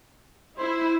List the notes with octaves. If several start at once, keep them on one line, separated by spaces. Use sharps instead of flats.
E4 C5